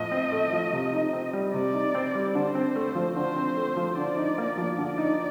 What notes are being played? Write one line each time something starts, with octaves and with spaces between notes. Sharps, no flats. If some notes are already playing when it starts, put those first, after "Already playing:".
Already playing: A2 F3 D#5
C4
A3
F3
C3
D#4
C4
G3
C3 D5
D#4
C4
G3
D3 C5
C4
A3
F3
D3 C5
C4
A3
F3
D3 D5
D#4
A#3
F3
D3 D5
D#4